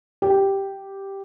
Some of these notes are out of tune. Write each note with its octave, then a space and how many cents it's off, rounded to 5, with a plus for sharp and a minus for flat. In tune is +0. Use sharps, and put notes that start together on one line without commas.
G4 +0